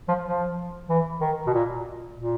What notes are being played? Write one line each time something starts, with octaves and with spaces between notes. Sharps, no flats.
F3
F3
E3
D#3
B2
A#2
A#2